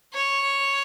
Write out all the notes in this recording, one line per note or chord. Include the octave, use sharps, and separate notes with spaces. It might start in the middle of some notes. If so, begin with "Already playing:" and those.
C#5